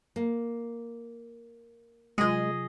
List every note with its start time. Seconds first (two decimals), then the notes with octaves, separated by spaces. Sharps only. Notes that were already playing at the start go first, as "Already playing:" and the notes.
0.16 A#3
2.18 C3 F#3 G#3 F4 G#4 D#5